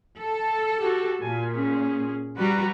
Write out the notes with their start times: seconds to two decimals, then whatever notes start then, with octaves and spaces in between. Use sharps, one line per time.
0.18 A4
0.79 F#4 G4
1.22 A#2 G#5
1.54 C#4 G#4
2.38 G3 F#4 B4 A#5